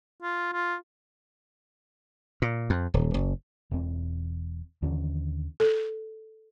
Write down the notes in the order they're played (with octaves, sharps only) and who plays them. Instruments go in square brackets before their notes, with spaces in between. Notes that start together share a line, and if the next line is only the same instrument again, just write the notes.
[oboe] F4
F4
[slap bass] A#2
F2
D#1
F#1
[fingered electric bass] E1 E2 E3 C4
D#2 D3 E3 C#4
[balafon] A4